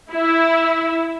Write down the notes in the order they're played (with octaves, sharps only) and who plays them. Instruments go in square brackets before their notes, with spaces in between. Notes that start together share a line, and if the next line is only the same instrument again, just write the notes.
[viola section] E4